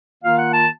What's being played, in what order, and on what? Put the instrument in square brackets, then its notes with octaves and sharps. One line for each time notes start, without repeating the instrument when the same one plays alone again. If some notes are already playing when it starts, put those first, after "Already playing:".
[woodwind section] D#3 A#3 F4 F5
F#5
A5